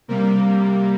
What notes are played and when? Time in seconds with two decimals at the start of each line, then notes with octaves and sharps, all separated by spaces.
0.08 C3 G3 A#3